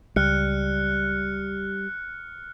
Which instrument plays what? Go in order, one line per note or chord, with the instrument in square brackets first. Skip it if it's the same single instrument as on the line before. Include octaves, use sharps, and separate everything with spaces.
[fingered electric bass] C#2 [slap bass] G3 [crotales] F6 F#6 C#7